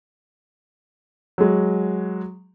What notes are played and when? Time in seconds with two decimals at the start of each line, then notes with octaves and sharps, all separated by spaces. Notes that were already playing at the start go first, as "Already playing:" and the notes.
1.38 F#3 G#3